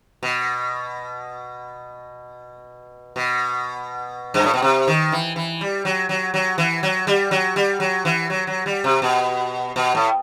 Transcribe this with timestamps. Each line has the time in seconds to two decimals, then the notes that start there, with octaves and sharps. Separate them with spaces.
0.23 B2
3.16 B2
4.34 G2
4.44 A2
4.54 B2
4.62 C3
4.88 D#3
5.12 E3
5.36 E3
5.61 G3
5.85 F#3
6.09 F#3
6.34 F#3
6.58 E3
6.83 F#3
7.07 G3
7.31 F#3
7.56 G3
7.80 F#3
8.05 E3
8.30 F#3
8.47 F#3
8.66 G3
8.84 C3
9.02 B2
9.76 B2
9.95 A2